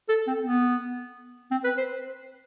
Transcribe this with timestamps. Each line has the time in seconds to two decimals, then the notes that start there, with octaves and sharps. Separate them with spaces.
0.09 A4
0.27 C4
0.44 B3
1.51 C4
1.64 B4
1.78 C5